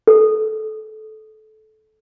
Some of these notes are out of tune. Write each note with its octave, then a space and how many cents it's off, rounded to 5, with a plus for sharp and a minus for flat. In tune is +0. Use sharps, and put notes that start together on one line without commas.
A4 -20